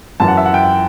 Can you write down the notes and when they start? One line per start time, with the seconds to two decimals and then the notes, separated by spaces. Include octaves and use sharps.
0.20 F#2 E3 A5
0.28 F#5
0.37 E5
0.46 F#5
0.54 G5